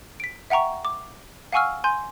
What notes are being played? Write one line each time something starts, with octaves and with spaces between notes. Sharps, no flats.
B6 D7
E5 F#5 G5 A#5 C#6
D6
F5 F#5 G#5 C#6 E6 F6
G#5 C6 G6